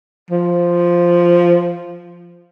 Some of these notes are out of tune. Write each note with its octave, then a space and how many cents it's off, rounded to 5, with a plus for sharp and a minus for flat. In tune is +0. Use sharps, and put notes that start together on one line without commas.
F3 -5